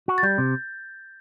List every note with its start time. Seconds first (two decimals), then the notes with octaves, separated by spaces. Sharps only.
0.08 F#4
0.18 A6
0.23 G3 G6
0.38 C3